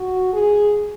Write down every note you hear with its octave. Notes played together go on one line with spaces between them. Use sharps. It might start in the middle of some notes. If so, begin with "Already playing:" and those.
Already playing: F#4
G#4